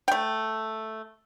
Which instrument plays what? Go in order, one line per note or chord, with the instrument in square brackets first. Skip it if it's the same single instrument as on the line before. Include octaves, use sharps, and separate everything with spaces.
[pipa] A3 G5